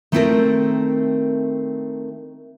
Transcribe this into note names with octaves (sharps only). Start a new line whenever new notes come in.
D#3 A3 C4 E4 A4 A#4